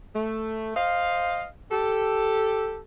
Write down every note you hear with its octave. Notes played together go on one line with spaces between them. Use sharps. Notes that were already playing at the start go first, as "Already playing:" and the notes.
A3
C5 D#5 F5
G4 A4